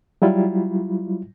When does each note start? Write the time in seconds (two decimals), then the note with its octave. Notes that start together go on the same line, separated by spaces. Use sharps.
0.22 F#3 G3 E4 F4